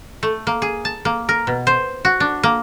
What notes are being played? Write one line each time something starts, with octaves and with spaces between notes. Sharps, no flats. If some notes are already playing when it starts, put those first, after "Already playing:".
A3
A#3
G#4
A5
A#3
A#4
B2
C5
F#4
D4
A#3